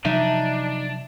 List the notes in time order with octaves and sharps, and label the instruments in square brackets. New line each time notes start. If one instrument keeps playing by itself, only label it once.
[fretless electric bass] C3 F3 F#3 [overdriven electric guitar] D4 [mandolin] D#4 [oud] E5